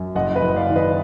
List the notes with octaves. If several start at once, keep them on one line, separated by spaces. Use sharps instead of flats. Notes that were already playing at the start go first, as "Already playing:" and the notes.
Already playing: F#2
F#1 D#5 F#5
B4 D#5
F#1
D#5
D5 F5
D#3
B4 D#5